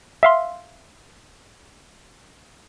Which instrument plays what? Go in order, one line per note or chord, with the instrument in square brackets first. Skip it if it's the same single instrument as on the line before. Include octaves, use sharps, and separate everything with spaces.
[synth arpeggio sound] E5 F5 C6